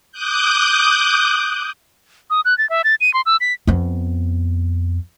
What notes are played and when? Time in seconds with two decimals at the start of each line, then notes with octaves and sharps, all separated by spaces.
0.12 D6 D#6 F#6 G6
2.30 D#6
2.45 F#6
2.58 A6
2.70 E5
2.84 A6
3.01 D#7
3.14 C6
3.26 E6
3.41 B6
3.67 F2 B3